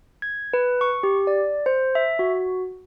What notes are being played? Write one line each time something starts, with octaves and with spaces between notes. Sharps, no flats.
G#6
B4
C#6
G4
D5
C5
E5
F#4